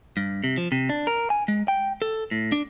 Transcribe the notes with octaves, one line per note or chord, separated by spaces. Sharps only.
G2
C3
F3
C3
D4
A#4
G#5
G#3
G5
A4
A2
D4